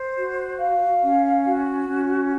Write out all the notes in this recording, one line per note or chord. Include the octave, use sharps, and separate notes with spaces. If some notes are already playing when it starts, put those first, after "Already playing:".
Already playing: C5
F#4
F5
C#4
F#4
C#4